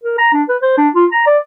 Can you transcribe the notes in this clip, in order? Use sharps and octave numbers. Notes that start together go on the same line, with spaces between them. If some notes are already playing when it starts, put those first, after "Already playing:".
A#4
A#5
D4
B4
C5
D4
F4
A#5
D5